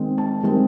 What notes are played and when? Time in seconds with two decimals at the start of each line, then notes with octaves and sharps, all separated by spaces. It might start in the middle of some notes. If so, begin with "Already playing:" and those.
Already playing: D#3 G#3 C4
0.18 A5
0.43 D#3 G#3 C4